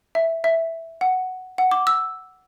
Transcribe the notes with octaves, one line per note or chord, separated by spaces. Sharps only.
E5
E5
F#5
F#5
D6
E6